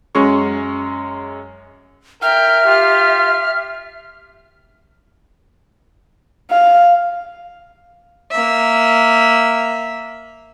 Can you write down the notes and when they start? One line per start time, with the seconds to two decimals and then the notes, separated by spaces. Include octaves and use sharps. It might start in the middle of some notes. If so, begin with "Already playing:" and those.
0.15 F#2 G#3 C#4 C#6
2.22 A#4 E5 G5 F6
2.66 F4 G4
6.51 F5
8.31 A#3 E5